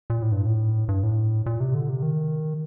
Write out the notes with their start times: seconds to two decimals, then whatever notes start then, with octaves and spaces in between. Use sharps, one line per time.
0.10 A#2
0.22 A2
0.32 G2
0.46 A2
0.88 G2
1.03 A2
1.46 A#2
1.60 C3
1.74 D3
1.89 C3
2.02 D#3